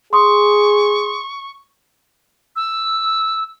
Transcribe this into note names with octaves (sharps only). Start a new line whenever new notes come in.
G#4 C6 C#6 D#6
E6